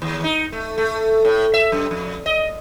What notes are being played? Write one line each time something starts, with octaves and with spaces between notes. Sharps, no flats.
D#2
D#4
A3
A3
A2
E5
F#2
F2
D#5